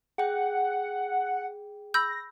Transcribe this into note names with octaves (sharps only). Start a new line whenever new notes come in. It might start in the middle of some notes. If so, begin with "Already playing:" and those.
G#4 F#5 G5
B5 E6 G6 A#6